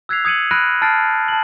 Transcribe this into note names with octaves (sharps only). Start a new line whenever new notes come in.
E6 F#6 G#6 B6 C7 F7
D#6 G#6 C#7 D#7 F#7
B5 F6 F#6 A#6 D7 D#7
A5 F6 A6 C7 D7
A5 F#7